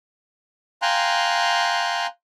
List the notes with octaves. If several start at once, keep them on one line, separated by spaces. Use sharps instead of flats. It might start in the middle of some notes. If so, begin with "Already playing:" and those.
F5 G5 G#5 A#5 C6 F#6